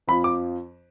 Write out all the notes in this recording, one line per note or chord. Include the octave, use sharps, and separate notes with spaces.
F2 F3 B5
D6